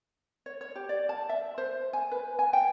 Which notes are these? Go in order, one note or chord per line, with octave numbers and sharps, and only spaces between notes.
C#5
C#5
G4
D5
A5
E5
C5
G#5
B4
G#5
G5